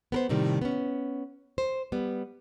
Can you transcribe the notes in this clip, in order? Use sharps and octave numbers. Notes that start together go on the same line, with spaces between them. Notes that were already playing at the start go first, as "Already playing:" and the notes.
B3 A#4 C5
A2 C3 D#3 G3 A3
B3 C#4
C5
G3 B3